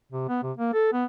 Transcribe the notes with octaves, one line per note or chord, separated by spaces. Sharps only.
C3
B3
C3
A#3
A4
B3